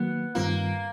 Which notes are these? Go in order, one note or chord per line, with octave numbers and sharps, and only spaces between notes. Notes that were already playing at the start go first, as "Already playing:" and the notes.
Already playing: D#3 F#3 A#3 B3
G2 D#3 G3 A#3 C4 F4